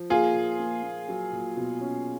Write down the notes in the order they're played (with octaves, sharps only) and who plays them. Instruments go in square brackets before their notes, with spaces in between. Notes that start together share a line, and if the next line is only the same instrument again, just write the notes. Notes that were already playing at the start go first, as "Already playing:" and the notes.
Already playing: [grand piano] F3
[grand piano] A#3 [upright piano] F4 G#4
[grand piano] A#2
A#3
A#3
F#3
A#2
B2
C#4